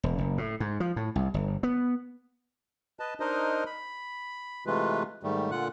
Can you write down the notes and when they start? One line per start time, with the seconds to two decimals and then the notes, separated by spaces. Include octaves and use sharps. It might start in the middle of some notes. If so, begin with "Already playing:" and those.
0.03 E1
0.18 F#1
0.38 A2
0.60 G#2
0.80 F3
0.96 A2
1.16 C2
1.34 G1
1.63 B3
3.00 B4 D#5 A5
3.20 D4 D#4 A#4 C5 D#5
3.66 B5
4.66 C3 E3 G#3 A3 F4 B4
5.23 G#2 D#3 G3 A3
5.51 A#2 D3 F4 F#5 F#6